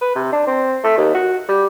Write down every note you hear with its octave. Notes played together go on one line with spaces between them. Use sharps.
B4
C3
D4
C4
A3
D#2
F#4
G3